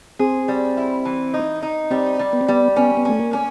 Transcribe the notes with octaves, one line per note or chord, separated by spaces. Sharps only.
C4 G#4
G3
E4
E3
D#4
D#4
G3 C4
G3
B3
C4
G3 B3
B3 C#4
B3
A3 C#4
A#3
C#4